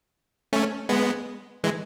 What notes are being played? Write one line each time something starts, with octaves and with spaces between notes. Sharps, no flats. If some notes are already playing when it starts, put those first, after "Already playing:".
A3 C#4
G#3 B3
E3 G#3